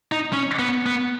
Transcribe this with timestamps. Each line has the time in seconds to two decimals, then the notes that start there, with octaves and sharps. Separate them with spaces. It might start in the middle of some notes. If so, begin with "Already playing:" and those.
0.12 D#4
0.33 C#4
0.59 B3
0.86 B3